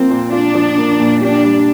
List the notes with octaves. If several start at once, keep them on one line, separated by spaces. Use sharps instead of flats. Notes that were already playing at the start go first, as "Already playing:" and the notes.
Already playing: F3 A#3 C4
A#2
D4 F4
F3
A#3
A#2
D4 G4
G3